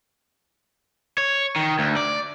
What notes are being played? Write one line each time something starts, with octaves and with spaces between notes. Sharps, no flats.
C#5
D#3
D2
D5